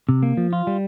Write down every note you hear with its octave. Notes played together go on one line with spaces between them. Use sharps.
C3
A#3
F3
F4
G3